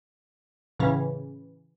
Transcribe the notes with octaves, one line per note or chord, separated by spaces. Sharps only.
A2 C#3 E3 C#4